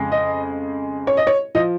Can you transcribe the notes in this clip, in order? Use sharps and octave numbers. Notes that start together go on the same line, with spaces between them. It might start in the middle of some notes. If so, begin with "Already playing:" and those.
Already playing: F2 C#3 G#3
D#5
C#5
D#5
C#5
F3 D#5